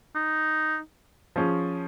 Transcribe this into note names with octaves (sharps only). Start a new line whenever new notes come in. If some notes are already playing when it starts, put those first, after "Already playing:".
D#4
F3 C#4 G#4